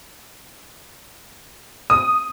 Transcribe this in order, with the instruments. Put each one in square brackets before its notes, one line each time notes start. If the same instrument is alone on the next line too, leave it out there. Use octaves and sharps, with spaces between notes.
[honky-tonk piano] D#6